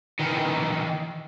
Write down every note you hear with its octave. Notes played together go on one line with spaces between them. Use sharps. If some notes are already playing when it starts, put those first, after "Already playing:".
D#3 E3